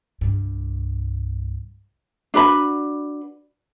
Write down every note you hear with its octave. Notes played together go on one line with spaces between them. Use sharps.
C2 G2
D4 F#4 B4 B5